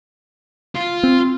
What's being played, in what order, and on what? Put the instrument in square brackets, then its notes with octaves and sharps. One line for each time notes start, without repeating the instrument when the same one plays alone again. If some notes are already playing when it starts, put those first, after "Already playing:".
[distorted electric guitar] F4
[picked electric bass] C4